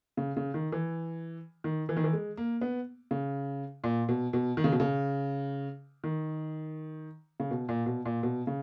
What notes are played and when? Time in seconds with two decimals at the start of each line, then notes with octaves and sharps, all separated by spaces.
0.17 C#3
0.37 C#3
0.54 D#3
0.72 E3
1.64 D#3
1.89 E3
1.97 D#3
2.04 E3
2.13 G#3
2.37 A#3
2.61 B3
3.11 C#3
3.84 A#2
4.09 B2
4.33 B2
4.57 D#3
4.64 C#3
4.72 B2
4.80 C#3
6.04 D#3
7.40 C#3
7.51 B2
7.69 A#2
7.86 B2
8.05 A#2
8.23 B2
8.47 C#3